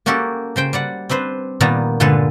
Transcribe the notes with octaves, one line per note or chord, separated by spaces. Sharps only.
A#3 C#4 F#4 G4 A4
C#3 C5 G5
G3 D5 F#5
C4 D4 B4 C5
A#2 D#3 G3 B3 A5 A#5
G2 A#2 D3 G#3 A4 B4